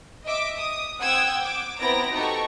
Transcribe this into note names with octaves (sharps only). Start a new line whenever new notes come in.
D#5 E5 D6
D#6
C4 F#5 G5 D#6 E6 G#6
D6
B3 C4 E4 A#5 A#6 D7
D#4 F#4 G4 A4 A#5 C#6